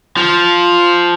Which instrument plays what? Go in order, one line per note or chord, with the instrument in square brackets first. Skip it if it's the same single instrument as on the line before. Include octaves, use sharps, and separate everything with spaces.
[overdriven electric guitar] F3